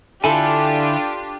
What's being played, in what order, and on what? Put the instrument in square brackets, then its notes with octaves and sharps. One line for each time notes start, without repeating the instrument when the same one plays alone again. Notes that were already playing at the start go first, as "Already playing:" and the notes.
[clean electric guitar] D3 E4 G#5 [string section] D4 F4 G4 [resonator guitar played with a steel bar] A4